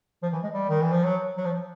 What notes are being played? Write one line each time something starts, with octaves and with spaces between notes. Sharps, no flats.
F3
E3
G#3
G3
D#3
E3
F3
F#3
F#3
F3